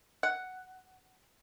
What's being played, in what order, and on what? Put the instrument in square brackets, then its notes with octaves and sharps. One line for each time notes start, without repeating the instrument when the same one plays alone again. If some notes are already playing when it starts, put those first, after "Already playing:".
[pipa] F#5